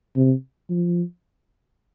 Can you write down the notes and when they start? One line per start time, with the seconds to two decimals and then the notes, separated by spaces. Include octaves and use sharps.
0.16 C3
0.70 F3